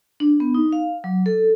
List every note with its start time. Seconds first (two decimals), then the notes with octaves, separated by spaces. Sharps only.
0.20 D4
0.40 B3
0.54 D#4
0.73 F5
1.04 F#3
1.26 A4